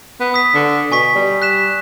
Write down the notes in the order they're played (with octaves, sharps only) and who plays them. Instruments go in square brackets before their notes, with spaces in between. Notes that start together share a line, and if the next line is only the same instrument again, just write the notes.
[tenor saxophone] B3
[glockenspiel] D#6 B6
[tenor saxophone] D3
[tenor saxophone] B2 [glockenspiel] G#5 C#6 B6
[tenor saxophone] G3
[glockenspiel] F#6 B6 E7